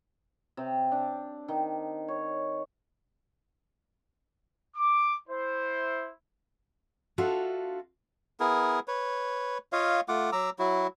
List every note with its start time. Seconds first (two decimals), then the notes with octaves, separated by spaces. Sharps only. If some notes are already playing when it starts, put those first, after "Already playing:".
0.57 C3
0.92 D4
1.48 D#3
2.08 C#5
4.76 D6
5.28 E4 C5
7.18 D4 F4 F#4 A4 E5 F5
8.40 B3 E4 G#4 A#4
8.88 B4 C#5
9.72 F4 C#5 D#5 F5
10.09 A3 F4 F#5 D6
10.32 F#3 A#5 D6 E6
10.59 F#3 E4 F#4